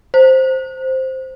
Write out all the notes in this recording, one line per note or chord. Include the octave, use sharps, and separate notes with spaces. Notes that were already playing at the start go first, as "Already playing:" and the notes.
C5